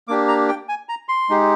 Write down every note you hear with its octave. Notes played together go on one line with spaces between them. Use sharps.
A#3 D4 G4 D6
A#5
G5
G#5
A#5
C6
G#3 D#4 G4